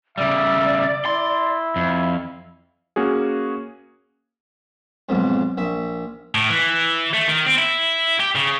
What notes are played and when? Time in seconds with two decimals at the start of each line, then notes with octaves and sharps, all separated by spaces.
0.18 C#3 G3 D5 E5
1.06 E4 C6
1.76 F2
2.96 A#3 C#4 F#4 G#4
5.09 B1 F2 G#2
5.57 A#1 E5
6.35 A2
6.50 E3
7.14 A3
7.28 D#3
7.47 C4
7.58 E4
8.20 G4
8.35 C#3